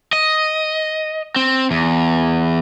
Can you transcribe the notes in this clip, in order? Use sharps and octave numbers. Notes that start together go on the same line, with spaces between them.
D#5
C4
E2